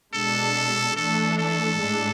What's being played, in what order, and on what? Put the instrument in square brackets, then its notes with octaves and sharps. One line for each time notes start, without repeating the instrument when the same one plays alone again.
[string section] B2 G#3 D4 [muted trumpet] A4
[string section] E3 A3 D4 [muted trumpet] A4
[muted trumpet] A4
[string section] A2 G#3 D4